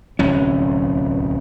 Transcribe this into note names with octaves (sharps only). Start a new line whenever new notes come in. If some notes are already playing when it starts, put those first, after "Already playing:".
D1 C2 C#4